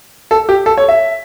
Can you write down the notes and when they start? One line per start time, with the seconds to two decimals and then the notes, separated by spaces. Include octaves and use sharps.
0.31 A4
0.49 G4
0.66 A4
0.77 C#5
0.88 E5